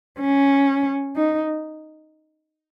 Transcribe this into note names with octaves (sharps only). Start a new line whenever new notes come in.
C#4
D#4